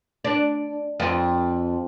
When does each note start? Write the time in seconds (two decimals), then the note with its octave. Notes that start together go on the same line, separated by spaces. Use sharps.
0.24 D4
1.00 F2